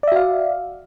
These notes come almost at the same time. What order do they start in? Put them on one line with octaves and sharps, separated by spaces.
D5 E5 F#4 F5